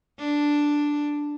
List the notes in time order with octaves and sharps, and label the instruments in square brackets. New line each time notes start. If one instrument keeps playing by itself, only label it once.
[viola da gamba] D4